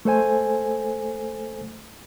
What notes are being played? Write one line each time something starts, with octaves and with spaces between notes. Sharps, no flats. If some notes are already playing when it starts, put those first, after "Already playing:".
A3 A4 C5 G#5